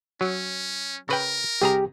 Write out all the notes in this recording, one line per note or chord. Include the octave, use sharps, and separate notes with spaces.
F#3 C#4
C#3 A#4 B4 G5
C2 G4 G#4 A#5